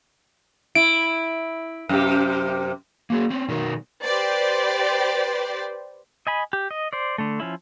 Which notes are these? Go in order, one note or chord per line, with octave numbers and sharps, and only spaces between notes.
E4 D7
F#2 C3 G4
A#3 F#4 G#4
C4 C#4
B2 D#3 F#3 B3 A#4
G4 B4 C5 D5
D#5 G#5 B5
G4
D#5
C5 D5
D3 A3
F3 C#4 E4